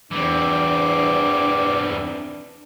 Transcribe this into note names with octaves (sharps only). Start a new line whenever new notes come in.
E2 E3 C4 D4 D6